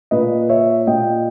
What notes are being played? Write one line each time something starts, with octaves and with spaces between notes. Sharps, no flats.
A#2 B4 D#5
C#5 E5
A#2 D#5 G5